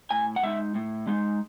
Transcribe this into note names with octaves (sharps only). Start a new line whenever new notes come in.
A2 G#5
F#5
G#3 D#4 E5
A2
G#3 D#4